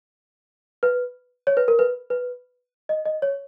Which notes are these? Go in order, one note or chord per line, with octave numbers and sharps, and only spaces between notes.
B4
C#5
B4
A#4
B4
B4
D#5
D#5
C#5